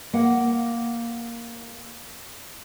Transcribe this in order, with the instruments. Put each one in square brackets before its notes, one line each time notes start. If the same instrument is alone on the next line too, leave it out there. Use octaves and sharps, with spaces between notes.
[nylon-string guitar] A#3 F#5